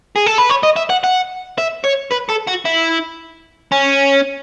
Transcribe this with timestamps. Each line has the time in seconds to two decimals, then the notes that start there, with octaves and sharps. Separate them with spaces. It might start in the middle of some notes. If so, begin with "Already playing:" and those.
0.16 G#4
0.26 A4
0.38 B4
0.50 C#5
0.63 D#5
0.76 E5
0.90 F#5
1.04 F#5
1.58 E5
1.84 C#5
2.11 B4
2.29 A4
2.47 F#4
2.65 E4
3.72 C#4